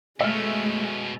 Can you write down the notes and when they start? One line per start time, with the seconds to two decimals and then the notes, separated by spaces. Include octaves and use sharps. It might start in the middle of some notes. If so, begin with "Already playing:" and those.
0.21 B2 G#3 A3 C#4 E5 E6 F6